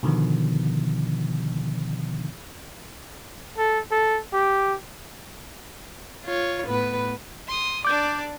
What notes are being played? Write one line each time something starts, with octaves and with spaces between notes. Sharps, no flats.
B2 D3 D#3 F3 B3
A4
A4
G4
F4 C#5
A2 B3 B4
C6 D#6
D4 D5 D6 G6